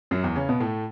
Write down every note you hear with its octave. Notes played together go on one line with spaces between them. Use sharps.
F#2 F#3
E2 E3
C#3 C#4
B2 B3
A2 A3